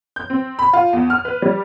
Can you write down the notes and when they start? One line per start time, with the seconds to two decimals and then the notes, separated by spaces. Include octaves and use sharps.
0.16 G6
0.30 C4
0.59 B5
0.73 F4
0.93 E2
1.10 F6
1.25 B4
1.42 G3